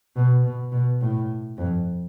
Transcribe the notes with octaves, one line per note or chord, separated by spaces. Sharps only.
B2
B2
B2
A2
F2